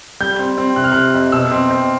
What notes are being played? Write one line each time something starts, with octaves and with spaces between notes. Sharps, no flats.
G3 G6
C4
C4
C3 F#6
F6
C3 F#6
F2
B2 E6
C4
C4